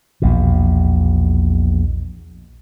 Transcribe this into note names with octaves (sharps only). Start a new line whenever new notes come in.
A#1 E2 B2